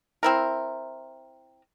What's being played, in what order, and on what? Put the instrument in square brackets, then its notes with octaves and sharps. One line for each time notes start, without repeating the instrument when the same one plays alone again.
[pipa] C4 E4 A#4